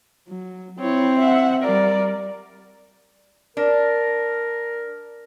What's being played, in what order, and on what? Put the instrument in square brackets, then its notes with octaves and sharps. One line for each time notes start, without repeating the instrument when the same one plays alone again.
[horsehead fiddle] F#3
[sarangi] C4 [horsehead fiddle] E4 C#5
[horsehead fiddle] E5 F#5
[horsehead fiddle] G3 A#4 [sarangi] D5
[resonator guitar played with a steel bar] D4 [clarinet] A#4